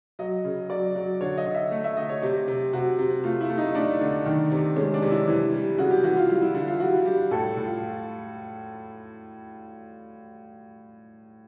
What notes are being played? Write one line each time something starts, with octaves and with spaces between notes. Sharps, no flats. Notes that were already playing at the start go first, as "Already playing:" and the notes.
F#3 D#5
C#3
F#3 D5
F#3
D3 C#5
D#5
D3
E5
A3
E5
D3 D#5
C#5
C3 G4
C3
C3 F#4
C3
A3 F4
E4
A3
D#4
A3 D4
D3
D#3
C3
G#3 C#4
D4
C3
E4
E3
G3
C#3 F#4
G4
E3 F#4
F4
G3 F4
E4
D3 E4
F4
G3 F#4
G3 G4
A2 A4
A2
F4